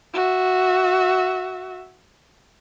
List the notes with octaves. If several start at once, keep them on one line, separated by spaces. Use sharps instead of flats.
F#4 E5